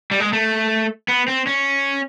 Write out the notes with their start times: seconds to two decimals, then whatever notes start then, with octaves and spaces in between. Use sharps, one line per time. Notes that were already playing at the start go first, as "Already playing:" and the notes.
0.11 G3
0.20 G#3
0.33 A3
1.08 B3
1.28 C4
1.47 C#4